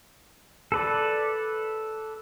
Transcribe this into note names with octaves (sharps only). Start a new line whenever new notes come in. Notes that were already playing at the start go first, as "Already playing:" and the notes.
A4 B4 D5